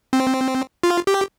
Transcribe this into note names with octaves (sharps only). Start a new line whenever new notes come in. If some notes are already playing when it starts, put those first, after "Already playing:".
C4
F4
G4